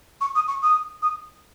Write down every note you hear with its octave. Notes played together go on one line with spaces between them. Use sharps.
C#6
D#6
C#6
D#6
D#6